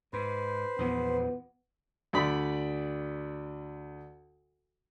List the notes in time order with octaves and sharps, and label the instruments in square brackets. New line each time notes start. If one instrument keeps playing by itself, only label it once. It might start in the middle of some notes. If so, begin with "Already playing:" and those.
[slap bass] G#2 [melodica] B4 C5
[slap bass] E2 A#2 F3 [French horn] B3
[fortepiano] D2 D5 B5